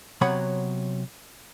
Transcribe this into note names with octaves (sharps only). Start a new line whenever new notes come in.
C3 F#3 B3 C#5 F#5 B5